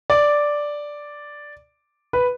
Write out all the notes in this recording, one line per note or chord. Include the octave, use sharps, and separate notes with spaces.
D5
B4